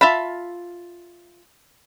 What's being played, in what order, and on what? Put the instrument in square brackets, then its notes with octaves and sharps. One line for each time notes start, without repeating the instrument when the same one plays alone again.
[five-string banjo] F4 E5 A5 B5